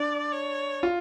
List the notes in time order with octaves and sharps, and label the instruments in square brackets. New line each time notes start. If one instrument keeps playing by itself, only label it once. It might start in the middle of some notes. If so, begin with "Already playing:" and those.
Already playing: [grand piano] D4 [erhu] D5
[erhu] C#5
[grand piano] F4